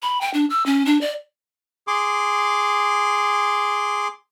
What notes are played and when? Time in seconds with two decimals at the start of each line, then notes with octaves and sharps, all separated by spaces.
0.02 B5
0.21 G5
0.34 D4
0.50 E6
0.66 C#4
0.86 D4
1.01 D5
1.87 G#4 C6 D6